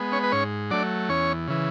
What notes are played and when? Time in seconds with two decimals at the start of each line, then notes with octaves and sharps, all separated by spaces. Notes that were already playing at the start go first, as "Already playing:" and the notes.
Already playing: G#3 B3
0.12 C#4 C#5
0.23 B4
0.32 G#2 C#4 C#5
0.70 F#3 A3 D4 D5
1.09 E2 C#4 C#5
1.48 C#3 E3